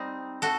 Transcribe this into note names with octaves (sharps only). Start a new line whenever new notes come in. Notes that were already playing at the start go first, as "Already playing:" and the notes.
Already playing: G3 C4 D#4
F#4 A4